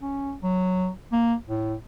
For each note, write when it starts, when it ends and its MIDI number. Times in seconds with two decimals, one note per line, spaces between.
0.01 0.33 61
0.42 0.89 54
1.12 1.34 58
1.49 1.74 45